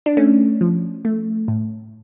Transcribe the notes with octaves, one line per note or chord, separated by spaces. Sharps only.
D4
A3 C#4
F3
A3
A2